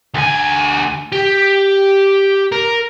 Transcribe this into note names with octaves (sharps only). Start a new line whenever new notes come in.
D2 G#5
G4
A#4